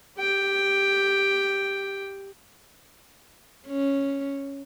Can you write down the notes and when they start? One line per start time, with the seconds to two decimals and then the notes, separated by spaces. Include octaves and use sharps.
0.19 G4 G5
3.66 C#4